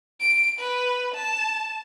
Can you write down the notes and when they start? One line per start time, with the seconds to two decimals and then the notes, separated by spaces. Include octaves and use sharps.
0.20 D7
0.59 B4
1.14 A5